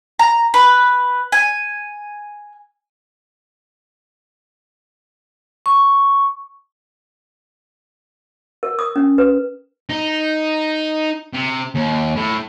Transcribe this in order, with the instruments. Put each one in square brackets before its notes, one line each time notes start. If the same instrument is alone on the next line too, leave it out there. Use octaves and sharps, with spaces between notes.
[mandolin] A#5
B4
G#5
[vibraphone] C#6
[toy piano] A#4
D#6
C#4
B4
[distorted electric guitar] D#4
C3
D#2
A2